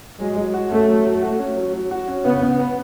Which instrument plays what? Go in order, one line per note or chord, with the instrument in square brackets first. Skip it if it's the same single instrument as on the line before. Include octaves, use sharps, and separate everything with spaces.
[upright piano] F#3 [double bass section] G#3
[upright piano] F#3
F#4
[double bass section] A3 [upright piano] C#4
[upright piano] F#3
F#3
F#4
C#4
F#3
F#3
F#4
C#4
[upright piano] C#3 [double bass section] B3
[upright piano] C#3
B3